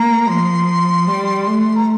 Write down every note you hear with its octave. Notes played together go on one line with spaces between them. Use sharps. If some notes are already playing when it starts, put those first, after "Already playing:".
Already playing: A#3 A#5
F3 C6
G3
A3
A#5